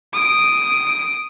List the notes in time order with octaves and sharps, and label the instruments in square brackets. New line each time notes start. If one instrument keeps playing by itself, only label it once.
[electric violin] D#6 D7